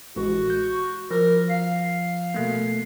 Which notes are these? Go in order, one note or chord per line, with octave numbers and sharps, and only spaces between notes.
A1 G#3 F#4
G6
F3 A#4
F5
B2 A3 A#3